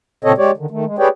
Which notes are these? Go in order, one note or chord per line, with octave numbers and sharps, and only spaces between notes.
A#2 C#3 C4 A4 C#5 D#5
G#3 G4 C#5 D5
D3 D#3
D#3 A3
G#3
G4 G#4 B4 C#5 D5 G5